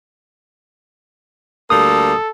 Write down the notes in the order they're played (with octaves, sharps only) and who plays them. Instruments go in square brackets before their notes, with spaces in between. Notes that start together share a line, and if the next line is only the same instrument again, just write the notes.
[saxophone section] D2 G3 A#3 [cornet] A4 [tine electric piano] D#6